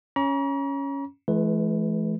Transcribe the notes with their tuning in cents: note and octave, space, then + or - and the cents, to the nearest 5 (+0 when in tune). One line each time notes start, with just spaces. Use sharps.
C#4 +0 A#5 +40 C#6 +45
E3 +30 A3 -45 B4 +0